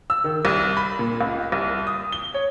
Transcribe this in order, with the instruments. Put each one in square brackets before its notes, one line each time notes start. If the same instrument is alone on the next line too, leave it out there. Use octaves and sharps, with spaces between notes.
[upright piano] E6
D#3
C2
B5
A#2
C#2
C2
D#6
G7
C#5